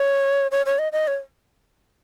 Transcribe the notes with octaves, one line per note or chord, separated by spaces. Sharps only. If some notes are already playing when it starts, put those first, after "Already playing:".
Already playing: C#5
C#5
C#5
D#5
D#5
C#5